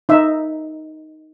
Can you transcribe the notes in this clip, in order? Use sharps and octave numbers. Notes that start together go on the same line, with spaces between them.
D#4 E5